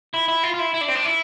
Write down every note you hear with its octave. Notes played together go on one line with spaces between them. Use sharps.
E4
E4
F4
F4
E4
E4
D4
C4
D4
E4